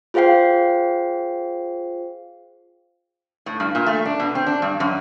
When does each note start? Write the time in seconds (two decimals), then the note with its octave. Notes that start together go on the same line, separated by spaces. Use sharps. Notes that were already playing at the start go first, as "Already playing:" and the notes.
0.14 F4 G#4 C5 F5 G5 C7
3.46 A2
3.60 G2
3.75 A#2
3.86 A3
4.05 D4
4.20 B2
4.35 C4
4.46 D4
4.62 G2
4.80 F#2